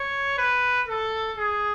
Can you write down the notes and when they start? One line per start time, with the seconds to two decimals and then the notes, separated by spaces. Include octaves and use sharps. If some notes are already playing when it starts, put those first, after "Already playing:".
Already playing: C#5
0.38 B4
0.88 A4
1.37 G#4